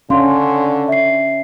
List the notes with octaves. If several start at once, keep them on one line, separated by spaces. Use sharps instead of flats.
D3 C#4 F5 C6
E5 C7